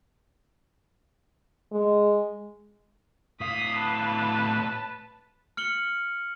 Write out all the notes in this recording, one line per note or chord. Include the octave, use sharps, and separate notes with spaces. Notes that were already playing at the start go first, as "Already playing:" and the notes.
G#3
A2 F5 D#6 B6
B4 A5
F6 C#7 F#7 G7